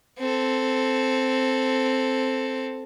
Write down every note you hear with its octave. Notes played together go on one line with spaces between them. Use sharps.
C4 A4